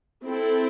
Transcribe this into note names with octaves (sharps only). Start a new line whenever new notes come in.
C4 E4 A4